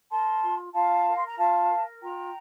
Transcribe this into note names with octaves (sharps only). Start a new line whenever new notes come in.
A#4 A5 C6
F4
F4 F5 A5
A#4
C6
A#5
F4 F5 A5
A#4
F4 G5 A#5